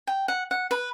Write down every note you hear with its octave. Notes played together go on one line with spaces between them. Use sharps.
G5
F#5
F#5
B4